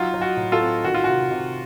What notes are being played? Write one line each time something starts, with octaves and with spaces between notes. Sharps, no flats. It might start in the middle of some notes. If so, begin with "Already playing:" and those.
Already playing: F#3 D#4 F4
F#3
F#4
A2
F4 A4
C4
D#3 F#4
F4
C3 F#4
C3